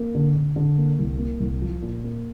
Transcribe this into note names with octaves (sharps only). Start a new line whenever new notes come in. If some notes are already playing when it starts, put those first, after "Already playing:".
Already playing: A#3
D3
D3
D3
A#3
C2
A#3
C2
F3
A#2
A#3